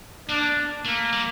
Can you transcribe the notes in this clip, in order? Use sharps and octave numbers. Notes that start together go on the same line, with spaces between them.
A#3 D4
A3 A#3
G3